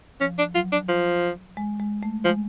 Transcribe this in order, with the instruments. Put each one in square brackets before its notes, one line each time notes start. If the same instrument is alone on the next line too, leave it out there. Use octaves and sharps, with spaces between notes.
[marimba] F3 [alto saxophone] C#4
[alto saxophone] D4
[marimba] F#3 [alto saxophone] F4
[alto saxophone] D4
F3
[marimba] G#3
G#3
A3
[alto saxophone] F3 [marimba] G#3